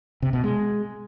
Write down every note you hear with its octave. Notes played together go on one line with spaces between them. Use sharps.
C3
B2
G#3